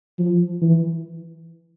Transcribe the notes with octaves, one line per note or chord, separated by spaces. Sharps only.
F3
E3